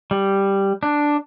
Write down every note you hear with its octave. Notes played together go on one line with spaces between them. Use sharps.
G3
D4